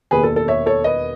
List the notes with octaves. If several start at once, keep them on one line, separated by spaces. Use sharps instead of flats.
E1 D#2 D#3 G#4 B4
A4
A4
C#5 E5
A4 C#5
B4 D#5